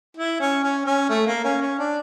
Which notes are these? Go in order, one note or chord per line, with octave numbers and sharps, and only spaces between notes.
E4
C#4
C#4
C#4
A3
A#3
C#4
C#4
D4